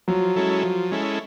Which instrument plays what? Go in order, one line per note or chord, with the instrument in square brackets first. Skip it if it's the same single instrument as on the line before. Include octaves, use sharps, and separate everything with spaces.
[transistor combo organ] F3 [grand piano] F#3
[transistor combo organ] G#3 C#4 E4 A4
F3
G#3 C#4 E4 A4